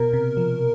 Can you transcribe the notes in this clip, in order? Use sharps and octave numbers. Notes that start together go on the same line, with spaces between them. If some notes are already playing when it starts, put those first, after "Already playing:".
Already playing: B2 A#4
C3
F3